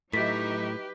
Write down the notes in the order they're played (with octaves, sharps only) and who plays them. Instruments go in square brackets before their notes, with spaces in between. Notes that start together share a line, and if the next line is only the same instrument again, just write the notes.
[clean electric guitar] A2 [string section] F#3 D#4 E5 [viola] G4 B4 [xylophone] B6